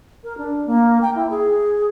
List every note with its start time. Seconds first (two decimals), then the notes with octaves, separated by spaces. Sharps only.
0.24 A#4
0.37 D4
0.66 A#3
1.01 G5
1.15 E4
1.30 G#4